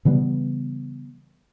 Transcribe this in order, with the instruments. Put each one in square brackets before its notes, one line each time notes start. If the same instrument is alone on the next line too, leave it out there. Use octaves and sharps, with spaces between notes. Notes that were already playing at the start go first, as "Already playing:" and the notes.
[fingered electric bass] C#3 E3 G3 B3